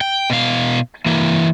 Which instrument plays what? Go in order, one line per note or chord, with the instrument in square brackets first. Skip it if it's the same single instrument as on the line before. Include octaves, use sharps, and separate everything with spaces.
[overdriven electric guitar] G5
B2 F5
E3 A#3